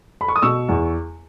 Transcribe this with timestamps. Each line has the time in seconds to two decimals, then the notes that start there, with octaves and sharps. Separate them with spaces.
0.21 B5
0.28 C#6
0.36 D#6
0.42 B2 C#6 E6
0.68 E2